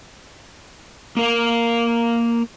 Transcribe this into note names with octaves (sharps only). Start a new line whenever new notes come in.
A#3 A#4 F5